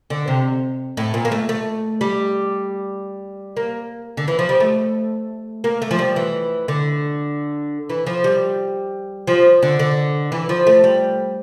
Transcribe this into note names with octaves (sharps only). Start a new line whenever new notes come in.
D3
C3
A2
A#2
A#3
A3
A3
G3
A#3
D3
E3
F3
G3
A3
A#3
A3
F3
G3
E3
D3
E3
F3
G3
F3
D3
D3
E3
F3
A3
G3